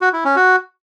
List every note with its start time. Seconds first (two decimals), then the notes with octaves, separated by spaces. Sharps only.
0.01 F#4
0.13 E4
0.24 C#4
0.36 F#4